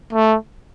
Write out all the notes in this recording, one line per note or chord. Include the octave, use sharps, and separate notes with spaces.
A3